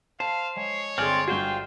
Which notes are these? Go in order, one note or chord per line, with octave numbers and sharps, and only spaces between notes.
C5 F5 A5
G#3 C#5
G1 C4 G#4 D5 G#5 C6 F6
G2 F4 F#4 G#4 C5 G5